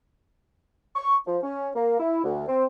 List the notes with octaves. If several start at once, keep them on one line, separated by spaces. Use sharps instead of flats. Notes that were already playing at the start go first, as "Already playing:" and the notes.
C#6
F3
C#4
A#3
E4
D2
C4